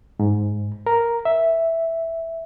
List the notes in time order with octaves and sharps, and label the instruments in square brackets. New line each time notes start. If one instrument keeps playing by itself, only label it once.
[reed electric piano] G#2
A#4
E5